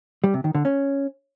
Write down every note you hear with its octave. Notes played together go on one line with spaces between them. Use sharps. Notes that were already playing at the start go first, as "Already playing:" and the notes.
G3
C3
D#3
D3
C#4